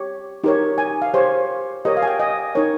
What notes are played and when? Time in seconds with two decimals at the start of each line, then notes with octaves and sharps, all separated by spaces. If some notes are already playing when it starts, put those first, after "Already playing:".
Already playing: G4 C#5
0.44 D#4 G4 A#4 C#5
0.78 G#5
1.02 F5
1.14 G4 C5 C#5
1.85 G4 A#4 C#5 D#5
1.97 F5
2.02 G#5
2.07 G5
2.20 D#5
2.55 D#4 A#4 C#5